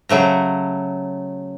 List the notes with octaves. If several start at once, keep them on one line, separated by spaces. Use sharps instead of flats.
C#3 F#3 A3 A#5